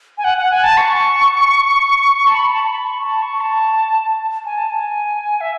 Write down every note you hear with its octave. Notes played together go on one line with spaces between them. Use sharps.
G#5
F#5
F#5
G#5
A5
C#6
A5
B5
A5
A5
B5
C#6
A5
C#6
A5
G#5
A5
G#5
E5